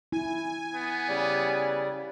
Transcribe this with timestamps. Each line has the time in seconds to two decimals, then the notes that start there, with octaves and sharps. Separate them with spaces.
0.12 E4 G#5
0.74 B3
1.09 C#3 G3 D5